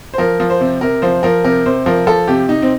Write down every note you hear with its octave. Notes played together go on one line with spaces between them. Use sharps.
C5
F3 A#4
F3
C5
C3
C3 A#4
F3 C5
F3 A#4
C3 A#4
C3 C5
F3 A#4
F3 A4
C3 G4
C3 D#4
C4